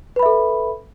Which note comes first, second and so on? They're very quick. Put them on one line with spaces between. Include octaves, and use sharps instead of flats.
B4 B5 E5 A4